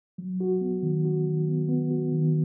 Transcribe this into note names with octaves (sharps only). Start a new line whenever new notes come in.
F#3
F#4
B3
D#3
F#4
D#3
B3
B3
F#4
D#3